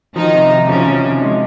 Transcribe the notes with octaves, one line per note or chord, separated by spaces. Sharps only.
D#3 F3 D#4
C3
C3
C#3 F3 C#4
F3
C3
G#3